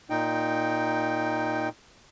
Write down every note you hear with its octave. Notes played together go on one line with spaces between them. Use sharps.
A#2 D#4 G5